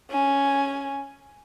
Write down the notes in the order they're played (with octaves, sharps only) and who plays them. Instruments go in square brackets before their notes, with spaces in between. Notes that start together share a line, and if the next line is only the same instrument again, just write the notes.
[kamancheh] C#4 G#5